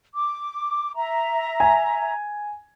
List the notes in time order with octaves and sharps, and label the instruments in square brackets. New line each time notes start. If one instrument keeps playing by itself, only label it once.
[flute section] D6
E5 A#5
[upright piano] G#5